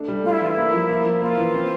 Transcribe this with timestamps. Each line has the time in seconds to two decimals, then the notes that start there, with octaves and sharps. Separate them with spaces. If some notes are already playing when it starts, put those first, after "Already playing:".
Already playing: A3 D4
0.08 G3
0.24 A3 F4
0.32 E4
0.41 E3 F4
0.49 E4
0.57 A#3
0.73 F3
0.89 A#3
1.05 F3
1.21 A#3 F4
1.38 E3
1.54 C4